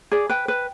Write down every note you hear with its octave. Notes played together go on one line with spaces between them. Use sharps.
G#4 D5
B4 G5
B4